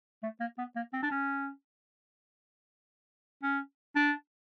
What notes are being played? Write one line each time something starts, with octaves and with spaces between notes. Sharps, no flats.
A3
A#3
B3
A#3
C4
D4
C#4
C#4
D4